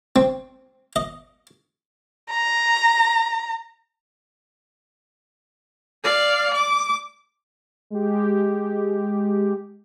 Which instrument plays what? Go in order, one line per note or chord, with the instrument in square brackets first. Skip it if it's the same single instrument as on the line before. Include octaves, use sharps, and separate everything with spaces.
[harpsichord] C4
D#5
[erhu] A#5
[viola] D5 F5
D6
[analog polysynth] G#3 G4